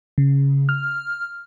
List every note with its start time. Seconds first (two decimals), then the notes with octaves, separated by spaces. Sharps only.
0.18 C#3
0.69 F6